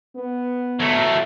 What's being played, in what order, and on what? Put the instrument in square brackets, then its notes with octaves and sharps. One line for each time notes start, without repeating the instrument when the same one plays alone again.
[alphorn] B3
[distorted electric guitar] F#3 A3